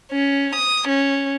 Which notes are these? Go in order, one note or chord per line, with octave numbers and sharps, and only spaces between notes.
C#4
D#6
C#4